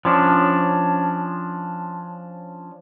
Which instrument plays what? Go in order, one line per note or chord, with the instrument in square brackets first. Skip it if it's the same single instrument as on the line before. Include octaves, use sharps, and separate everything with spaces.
[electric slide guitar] F3 C#4 D4